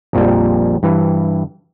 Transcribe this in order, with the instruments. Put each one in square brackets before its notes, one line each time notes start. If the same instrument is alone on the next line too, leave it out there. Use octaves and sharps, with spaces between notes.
[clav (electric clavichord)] A#1 F2 A#2 G3
G2 E3